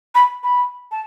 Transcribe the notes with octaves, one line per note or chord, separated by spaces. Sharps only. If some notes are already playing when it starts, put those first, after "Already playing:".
B5
B5
A5